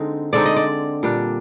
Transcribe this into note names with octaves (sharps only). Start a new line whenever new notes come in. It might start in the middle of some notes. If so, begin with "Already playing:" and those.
Already playing: D3 G#3 C4 D#4
D3 G#3 C4 D#4 D5
D#5
D5
A#2 G3 D4